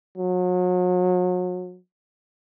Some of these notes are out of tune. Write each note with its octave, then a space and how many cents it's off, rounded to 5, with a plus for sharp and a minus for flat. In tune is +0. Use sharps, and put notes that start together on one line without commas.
F#3 -35